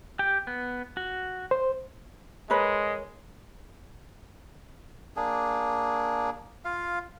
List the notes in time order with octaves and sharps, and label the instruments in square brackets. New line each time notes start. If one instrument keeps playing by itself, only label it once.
[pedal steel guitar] G4 G5
B3
F#4
[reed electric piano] C5
[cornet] G#3 [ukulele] A#4 B4 C#5
[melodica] A#3 D4 G#4
F4 F5